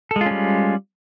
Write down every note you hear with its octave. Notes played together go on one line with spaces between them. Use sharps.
G3 G#3 C#4 F4 A4